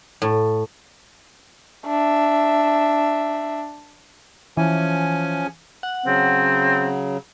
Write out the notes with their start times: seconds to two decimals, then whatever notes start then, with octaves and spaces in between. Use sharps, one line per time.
0.22 A2
1.87 D4 E5
4.57 E3 F3 C#4 G#5
5.83 F#5
6.06 C#3 F#3 C4